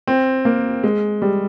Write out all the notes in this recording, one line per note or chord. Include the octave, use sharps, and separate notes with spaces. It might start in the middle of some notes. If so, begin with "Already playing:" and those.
C4
A#3
G#3
G3